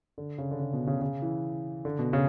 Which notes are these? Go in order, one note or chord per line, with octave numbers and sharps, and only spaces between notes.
D3
C#3
D3
C#3
B2
C#3
C#3
E3
D3
B2
C#3